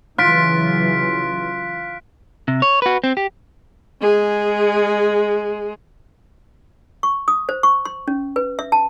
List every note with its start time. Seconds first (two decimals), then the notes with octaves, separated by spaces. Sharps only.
0.18 C#3 E3 F#3 F4 F#6 B6 D7
2.48 C3
2.62 C#5
2.82 F#4 B4
3.04 C4
3.17 G4
4.01 G#3 G#4
7.03 C#6
7.28 D#6
7.49 C5
7.63 C#6
7.85 C6
8.08 C#4
8.36 B4
8.59 E5
8.72 A5